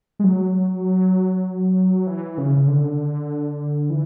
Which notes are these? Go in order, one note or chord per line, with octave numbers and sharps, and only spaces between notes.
G#3
F#3
E3
C#3
C#3
D3
E3